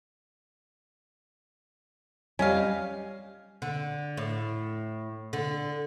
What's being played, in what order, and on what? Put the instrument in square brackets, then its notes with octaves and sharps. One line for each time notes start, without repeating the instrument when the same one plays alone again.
[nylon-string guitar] G3 C#5 D#5 [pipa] C#4 F5
[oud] D3
A2
D3